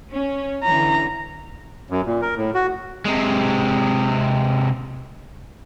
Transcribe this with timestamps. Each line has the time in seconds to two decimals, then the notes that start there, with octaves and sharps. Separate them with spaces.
0.12 C#4
0.63 D3 E3 C#4 A#5
1.90 F#2
2.06 A#2
2.22 A#4
2.36 A2
2.55 F#4
3.05 C3 G#3